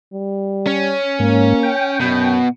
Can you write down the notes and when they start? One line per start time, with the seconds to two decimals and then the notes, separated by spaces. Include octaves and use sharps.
0.13 G3
0.67 C#4
1.20 G#2 A#3
1.63 G5
2.00 F#2 B2